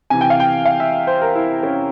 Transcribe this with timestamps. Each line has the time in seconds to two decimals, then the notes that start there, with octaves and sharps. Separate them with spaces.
0.10 C3 E3 G#5
0.21 G5
0.30 F5
0.40 G5
0.65 F5
0.80 E5
1.07 C5
1.22 A#4
1.35 E4
1.63 C#4